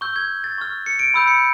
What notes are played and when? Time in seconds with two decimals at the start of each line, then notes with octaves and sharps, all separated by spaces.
0.01 C#6 E6 G6
0.16 G#6
0.44 A6
0.58 C#6 F6
0.86 C#7
0.99 D7
1.14 B5 E6 G6
1.28 C#7